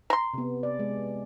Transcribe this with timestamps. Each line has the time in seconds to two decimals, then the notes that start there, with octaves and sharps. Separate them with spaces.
0.10 A#5 C6
0.34 C3 B3
0.63 D5
0.79 G#3